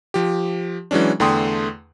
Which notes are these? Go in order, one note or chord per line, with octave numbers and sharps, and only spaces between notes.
F3 G4
E3 F#3 G#3 C#4 D4
E2 D3 A3 G5 C6 D#6